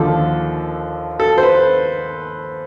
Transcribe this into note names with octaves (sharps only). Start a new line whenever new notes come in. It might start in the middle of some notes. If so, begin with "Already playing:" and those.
Already playing: D#2 D3 F3 A4
A4
C5
B4